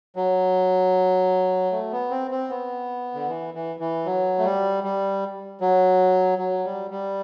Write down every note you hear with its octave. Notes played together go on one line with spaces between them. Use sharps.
F#3
A3
B3
C4
C4
B3
D3
E3
E3
E3
F#3
A3
G3
G3
F#3
F#3
G3
G3